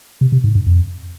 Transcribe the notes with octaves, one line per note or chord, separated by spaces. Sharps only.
C3
C3
G#2
G2
F2